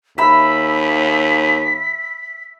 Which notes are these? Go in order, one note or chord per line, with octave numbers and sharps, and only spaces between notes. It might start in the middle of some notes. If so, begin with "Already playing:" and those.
D#2 E5 B5 B6